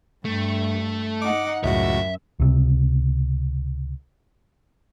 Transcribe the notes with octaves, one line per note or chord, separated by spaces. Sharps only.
G2 A3
D#4 F#5 D6
C#2 F#2 A2 F#4 E5
C#2 C3